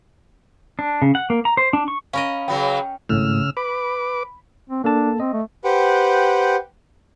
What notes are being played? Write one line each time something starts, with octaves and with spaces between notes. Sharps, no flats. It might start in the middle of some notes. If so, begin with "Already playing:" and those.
D4
C#3
F#5
A#3
A#5
C5
D4
C#6
C#4 A#4 D#5 F5 B5
C#3 F#3 B3 G5
G#1 A2 C#3 E6 F6
B4 B5 D6
C4
A#3 D4 A4 A5
C4 D#5
A3
G4 B4 C5 F#5 G5